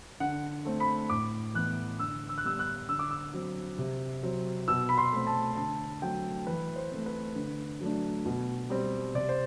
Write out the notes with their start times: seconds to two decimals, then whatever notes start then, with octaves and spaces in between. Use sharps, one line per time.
0.20 D3 F#5
0.65 A3 C4
0.80 B5
1.10 A2 D6
1.54 E3 B3 F#6
1.99 D3 E6
2.29 E6
2.38 F#6
2.44 G3 B3 D4 E6
2.59 F#6
2.89 D3 E6
2.99 D6
3.11 E6
3.33 F#3 C4
3.78 C3
4.23 F#3 C4
4.68 B2 E6
4.89 B5
4.98 C6
5.12 A3 C4
5.27 A5
5.57 D3 A5
6.02 F#3 A3 C4 G5
6.47 E3 B4
6.76 C5
6.91 A3 C4
7.06 B4
7.36 D3
7.80 F#3 A3 D4
8.26 B2
8.70 G3 C4
9.15 C3 D5
9.29 C5